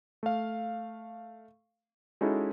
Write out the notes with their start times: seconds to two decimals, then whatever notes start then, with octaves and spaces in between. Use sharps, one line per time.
0.23 A3 F5
2.21 G#3 C#4 D#4 E4 F#4 A4